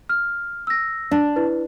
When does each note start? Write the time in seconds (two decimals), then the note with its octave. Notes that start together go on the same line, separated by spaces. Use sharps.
0.09 F6
0.67 E6 A#6
1.11 D4
1.36 E4 B4